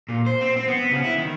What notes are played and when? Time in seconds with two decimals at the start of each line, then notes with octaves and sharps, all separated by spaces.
0.09 A#2
0.26 C5
0.41 C4
0.56 C4
0.68 B3
0.91 C#3
1.04 E4
1.18 D#3